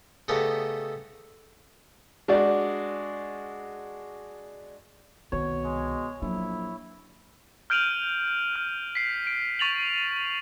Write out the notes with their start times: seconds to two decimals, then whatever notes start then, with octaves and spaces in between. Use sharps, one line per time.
0.28 C#3 A3 B3 D#4 G4
2.28 G#3 D4 F#4 D5
5.32 C2 B2 D#3 C#5
5.65 G#3
6.22 A#1 F#3 E4
7.70 F6 G6 D7 D#7 F7 F#7
8.56 F6
8.95 B6 C7
9.27 D7
9.59 C#6 A6 F7 F#7